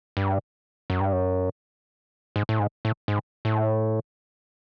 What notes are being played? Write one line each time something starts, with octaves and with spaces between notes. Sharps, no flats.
G2
F#2
G2
F#2
G#2
A2
G#2
A2
G#2
A2